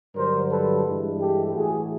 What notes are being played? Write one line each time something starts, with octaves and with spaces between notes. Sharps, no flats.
G2 D3 F#3 A#4 C5
A4 B4
G2 E3 G#3
G4 A4
A2 E3 A3 F#4 G#4